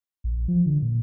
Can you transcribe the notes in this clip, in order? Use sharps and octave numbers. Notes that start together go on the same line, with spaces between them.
A#1
F3
D3
A#2